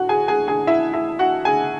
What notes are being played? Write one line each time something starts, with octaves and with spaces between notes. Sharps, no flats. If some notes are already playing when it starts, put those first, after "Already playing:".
Already playing: A2 F#4 F#5
G#4 G#5
G#4 G#5
G#4 G#5
E4 E5
E4 E5
F#4 F#5
G#4 G#5